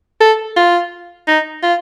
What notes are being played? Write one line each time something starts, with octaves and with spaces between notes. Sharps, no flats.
A4
F4
D#4
F4